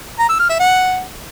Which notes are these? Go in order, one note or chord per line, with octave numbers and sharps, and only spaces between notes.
A#5
E6
F6
E5
F#5